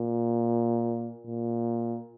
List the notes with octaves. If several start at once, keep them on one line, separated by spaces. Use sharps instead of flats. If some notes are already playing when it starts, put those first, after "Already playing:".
Already playing: A#2
A#2